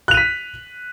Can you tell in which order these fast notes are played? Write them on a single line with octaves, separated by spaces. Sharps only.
F#6 F7 D#7 B6